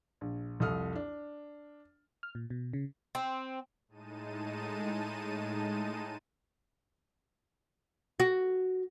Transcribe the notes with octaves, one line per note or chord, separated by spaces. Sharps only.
A#1
C2 F2 A4 D#6 F6
D4
F6
A#2
B2
C#3
C4
A2 G#3 D#4 A5 D#7
F#4